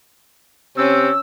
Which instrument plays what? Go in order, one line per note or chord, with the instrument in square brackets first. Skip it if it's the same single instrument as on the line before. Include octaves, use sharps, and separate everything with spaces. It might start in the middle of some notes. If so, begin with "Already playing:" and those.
[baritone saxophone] C3 [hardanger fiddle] C#4 [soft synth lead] E6